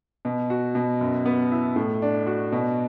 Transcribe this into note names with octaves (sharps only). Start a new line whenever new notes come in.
B2
F#4
B2
F#2
B3
E4
A2
D4
F#4
B2